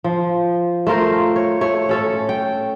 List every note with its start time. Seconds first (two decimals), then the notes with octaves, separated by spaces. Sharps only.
0.04 F3
0.87 A3 F4 A#4 C5
1.36 C#5
1.61 A3 C#5
1.89 C#4 A4 C#5
2.29 G5